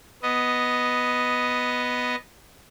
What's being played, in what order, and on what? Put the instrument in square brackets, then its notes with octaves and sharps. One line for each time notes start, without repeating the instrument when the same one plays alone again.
[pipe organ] B3 D#5